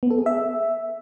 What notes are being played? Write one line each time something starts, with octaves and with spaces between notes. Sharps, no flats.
B3
A4
G#4
E5